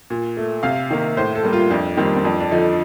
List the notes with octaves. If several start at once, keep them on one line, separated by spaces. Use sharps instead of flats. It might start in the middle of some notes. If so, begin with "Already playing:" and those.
A#2
A3
C3 F5
D#3 A#3
A2 C5
A4
G3 A#3
F4
F2 D4
D#3 G3 A#3 C4
C4
F2 D4
D4
D3 F3 D#4